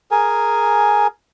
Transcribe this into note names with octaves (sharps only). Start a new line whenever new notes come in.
G#4 A#4 G#5